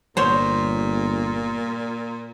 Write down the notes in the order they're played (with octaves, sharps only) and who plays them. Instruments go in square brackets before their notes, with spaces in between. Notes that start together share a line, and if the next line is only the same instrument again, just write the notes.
[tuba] G1 [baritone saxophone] A#2 [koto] C5 C#5